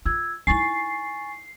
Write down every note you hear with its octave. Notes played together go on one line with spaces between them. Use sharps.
F4 E6 G#6
D#4 E4 G#5 C#6 A6 C7